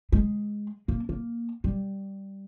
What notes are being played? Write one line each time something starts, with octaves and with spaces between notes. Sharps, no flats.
G#3
A#3
A#3
G3